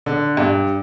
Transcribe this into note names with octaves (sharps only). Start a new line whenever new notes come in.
D3
G2